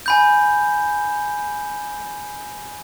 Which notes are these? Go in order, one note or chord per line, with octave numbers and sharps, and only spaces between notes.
G#5 B5 G6